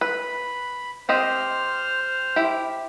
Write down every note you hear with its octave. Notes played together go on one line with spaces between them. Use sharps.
B4 B5
C4 G4 C5 D#5 F6
E4 G4